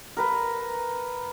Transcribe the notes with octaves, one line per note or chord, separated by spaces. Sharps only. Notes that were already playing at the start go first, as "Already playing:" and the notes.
A#4 B4 A#5